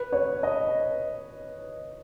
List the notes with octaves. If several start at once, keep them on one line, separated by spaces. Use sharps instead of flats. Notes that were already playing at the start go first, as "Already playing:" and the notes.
Already playing: B4
C#5
D#5